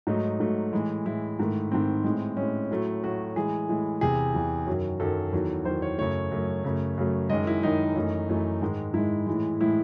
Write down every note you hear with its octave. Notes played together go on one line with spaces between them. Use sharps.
G#2 F#3 A3 D#4
G#2 F#3 A3
A2 E3 G#3
A2 E3 G#3 E4
G#2 D#3 A3
G#2 D#3 A3 C4
A2 G#3
A2 G#3 C#4
A2 F#3 A3
A2 F#3 A3 F#4
A2 E3 G#3 G#4
A2 E3 G#3
E2 C3 E3 G#4
E2 C3 E3
F#2 D#3 F#3
F#2 D#3 F#3 A4
E2 D#3 F#3
E2 D#3 F#3 C5
C#5
F#2 C#3 F#3 A3 C#5
F#2 C#3 F#3 A3
F#2 C#3 F#3 A3
F#2 C#3 F#3 A3
F#2 D#3 G#3 D#5
E4
F#2 D#3 G#3 D#4
F#2 E3 A3
F#2 E3 A3
G#2 D#3 G#3
G#2 D#3 G#3 E4
A2 E3 G#3
A2 E3 G#3 E4